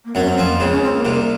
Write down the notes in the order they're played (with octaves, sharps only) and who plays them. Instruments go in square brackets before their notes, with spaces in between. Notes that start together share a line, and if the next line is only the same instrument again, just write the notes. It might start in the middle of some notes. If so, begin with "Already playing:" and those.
[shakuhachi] A#3
[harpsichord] F#2 F#3 [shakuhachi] C4
[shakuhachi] C#4
C4
[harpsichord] F2 F3
[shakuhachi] A#3
[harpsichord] C#2 C#3 [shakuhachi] C4
[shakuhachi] C#4
C4
A#3
[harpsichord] C2 C3